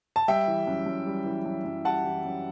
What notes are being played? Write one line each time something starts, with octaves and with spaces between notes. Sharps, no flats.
A5
G3 E5 G5
E3
F#2
F#2
G3
E3
F#2
F#2
G3 F#5 A5
E3
F#2